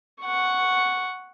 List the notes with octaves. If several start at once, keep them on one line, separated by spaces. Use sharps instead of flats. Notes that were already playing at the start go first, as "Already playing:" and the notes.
F#5 C#6